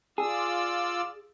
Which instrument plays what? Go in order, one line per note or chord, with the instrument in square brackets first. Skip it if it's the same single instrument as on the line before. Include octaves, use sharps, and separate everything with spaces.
[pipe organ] F4 D5 E6 [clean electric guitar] G#4